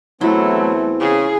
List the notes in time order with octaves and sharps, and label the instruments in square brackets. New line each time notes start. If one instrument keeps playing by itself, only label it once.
[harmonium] E2 C4 [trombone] F#3 [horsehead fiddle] A3 [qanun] E4
[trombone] C#3 [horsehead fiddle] G#4